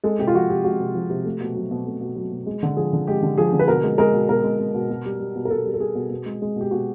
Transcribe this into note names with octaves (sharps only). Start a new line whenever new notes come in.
G#3 A4
C3 G4
F4
F3 F#4
C3 G4
G#3 F#4
C3
F3
C3
A3
B2
F#3
B2
A3
B2
F#3
B2
G#3
D3
F3 G#4
D3
G#3 G4
D3
F3 G#4
D3
B4
B2 A#4
G#3
G#3 A#4
B2
B2 A#4
G#3
G#3
B2
B2
G3
G3
B2
A#4
B2 A4
G3
A4
G3 G#4
B2
B2
G#3
G#3
B2 G4
B2 F#4